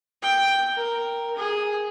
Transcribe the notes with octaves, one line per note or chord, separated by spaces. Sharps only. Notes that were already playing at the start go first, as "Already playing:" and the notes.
G5
A#4
G#4